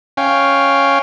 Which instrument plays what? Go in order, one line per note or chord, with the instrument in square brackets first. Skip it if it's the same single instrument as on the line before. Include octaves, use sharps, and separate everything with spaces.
[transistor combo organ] C#4 F5 G5